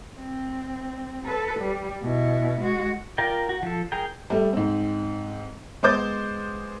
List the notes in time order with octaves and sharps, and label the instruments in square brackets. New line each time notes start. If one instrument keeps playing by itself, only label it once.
[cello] C4
A4 B4
G3
B2 E4
G#3 F#4
[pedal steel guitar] F4 A#4 D5 G5
F#4
F3 A4
G#4 A#4 G5
[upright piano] G3 A3
G#2 C4
G#3 B3 C5 D6 G6 A6